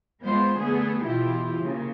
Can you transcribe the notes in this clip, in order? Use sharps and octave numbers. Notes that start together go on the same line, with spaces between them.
G#3 B3 F4 C5
D3 A3 B3 G#4
B2 E3 E4 F4 G4
C#3 A#3